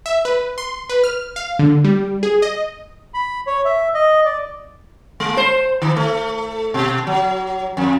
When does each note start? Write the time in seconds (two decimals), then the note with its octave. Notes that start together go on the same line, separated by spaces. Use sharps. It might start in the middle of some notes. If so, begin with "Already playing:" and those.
0.06 E5
0.25 B4
0.58 C6
0.89 B4
1.04 F6
1.36 F5
1.59 D3
1.84 G3
2.23 G#4
2.42 D#5
3.14 B5
3.47 C#5
3.65 E5
3.94 D#5
4.25 D5
5.20 G#3
5.37 C5
5.82 D#3
5.96 A3
6.74 B2
7.07 F#3
7.77 F2